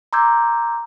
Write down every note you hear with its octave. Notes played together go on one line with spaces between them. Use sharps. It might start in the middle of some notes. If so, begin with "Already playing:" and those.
A#5 C6 D6 E6 G6 G#6